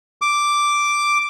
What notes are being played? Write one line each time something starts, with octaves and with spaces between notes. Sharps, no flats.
D6